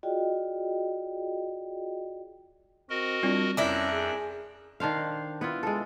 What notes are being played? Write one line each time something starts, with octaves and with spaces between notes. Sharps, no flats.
F4 F#4 G#4 D5 D#5 G5
C4 F#4 A#4 D#5
G3 C4 D4 F4
F2 C#4 D4 E4 A#4
G#4
D#3 D4 C5 F5
B3 E4 F4
G#3 A4